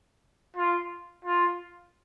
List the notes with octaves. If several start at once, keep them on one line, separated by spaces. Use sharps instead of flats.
F4
F4